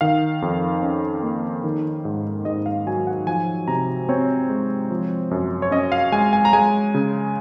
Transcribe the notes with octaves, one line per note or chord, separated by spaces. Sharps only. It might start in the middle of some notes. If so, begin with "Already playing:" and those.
D#3 F5
F2
C#4
A#3
D#3
G#2
G#2 D#5
F5
F#3 G#5
F#5
F3 G#5
C3 A#5
C4 C#5
G#3
F3
F#2
C#5
C#4 D#5
F5
G#3 G#5
G#5
A#5
G#3 G#5
C#3